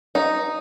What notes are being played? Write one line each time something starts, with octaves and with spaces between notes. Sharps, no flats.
D#4